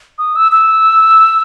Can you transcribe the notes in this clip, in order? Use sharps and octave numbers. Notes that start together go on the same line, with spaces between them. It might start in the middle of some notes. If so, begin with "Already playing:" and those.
D#6
E6
E6